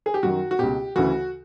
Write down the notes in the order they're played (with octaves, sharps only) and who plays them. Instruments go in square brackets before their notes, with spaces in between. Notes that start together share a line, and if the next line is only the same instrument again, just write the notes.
[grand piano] G#4
G4
F#2 D#3 F#4
F#4
C#2 B2 G4
D2 C#3 E3 F#4